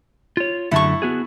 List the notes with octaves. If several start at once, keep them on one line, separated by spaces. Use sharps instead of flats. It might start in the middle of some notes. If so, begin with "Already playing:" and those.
F4 C#5
F#2 D3 A3 E4 A5 C#6
B3 F#4 G#4